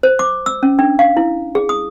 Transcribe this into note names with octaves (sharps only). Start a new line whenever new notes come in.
C5
D6
E6
C#4
D4
F5
E4
G#4
D#6